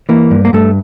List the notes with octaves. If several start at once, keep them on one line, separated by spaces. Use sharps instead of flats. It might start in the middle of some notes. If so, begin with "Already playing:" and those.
E3 A#3
G2
A#3
G2 A3